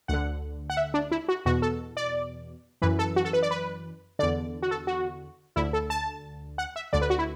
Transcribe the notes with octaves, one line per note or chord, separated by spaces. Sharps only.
D2 D3 F#5
F#5
E5
D4
E4
F#4
E2 B2 F#4
A4
D5
F#2 E3 B4
A4
F#4
A4
B4
D5
B4
E2 D3 D5
F#4
A4
F#4
D2 D3 E4
A4
A5
F#5
E5
D2 D3 D5
B4
F#4
E4